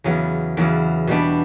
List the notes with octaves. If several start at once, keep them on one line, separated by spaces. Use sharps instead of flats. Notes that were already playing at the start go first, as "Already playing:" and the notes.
E2 C#3 F#3 B3
E2 C#3 F#3 B3
B2 G3 B3 D4